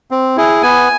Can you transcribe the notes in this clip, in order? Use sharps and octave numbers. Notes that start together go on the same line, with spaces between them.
C4
E4 G#4
B3 G#5